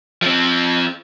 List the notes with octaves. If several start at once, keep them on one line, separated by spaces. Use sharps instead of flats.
F3 C4